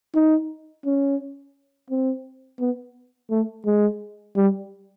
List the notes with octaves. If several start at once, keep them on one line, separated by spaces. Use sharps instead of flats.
D#4
C#4
C4
B3
A3
G#3
G3